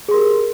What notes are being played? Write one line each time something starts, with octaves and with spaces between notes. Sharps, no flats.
G4 G#4 A#4 C6